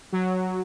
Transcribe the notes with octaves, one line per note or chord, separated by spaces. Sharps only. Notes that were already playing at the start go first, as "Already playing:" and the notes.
F#3